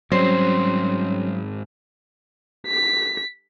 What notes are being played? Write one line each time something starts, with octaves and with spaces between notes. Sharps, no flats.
G#2 F#3 G3 C4 C#4 C5 C#5
B6